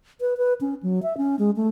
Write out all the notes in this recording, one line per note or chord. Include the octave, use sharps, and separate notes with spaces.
B4
B4
C#4
F#3
E5
C#4
G#3
A3